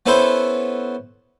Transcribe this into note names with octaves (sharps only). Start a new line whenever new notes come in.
B3 C#4 E4 A4 B4 C5